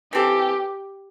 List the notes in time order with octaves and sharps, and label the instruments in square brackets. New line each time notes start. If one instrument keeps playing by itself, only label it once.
[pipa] E3 C4 A4 [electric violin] G4